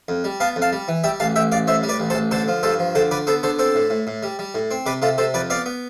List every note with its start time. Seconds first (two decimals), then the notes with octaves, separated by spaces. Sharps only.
0.08 F2
0.24 G3
0.40 B3 F5 A5
0.56 F2
0.62 F5 A5
0.73 G3
0.88 E3
1.04 G3 E5 G5
1.20 A1 F5 A5
1.36 A1 E5 G5
1.52 A1 D5 F5
1.67 A2 C5 E5
1.83 G3
1.89 B4 D5
2.00 A1
2.10 A4 C5
2.15 A1
2.31 D3 A4 C5
2.48 F3
2.63 G2 A4 C5
2.80 F3
2.95 D3 A4 C5
3.11 D3 B4 D5
3.27 B3 A4 C5
3.43 D3 A4 C5
3.59 C4 A4 C5
3.75 A2
3.90 A2
4.07 A2
4.23 G3
4.39 G3
4.55 A2
4.71 C4
4.86 C3 B4 D5
5.02 C3 F4 A4
5.18 C3 A4 C5
5.34 F2 B4 D5
5.50 B3 D5 F5
5.66 B3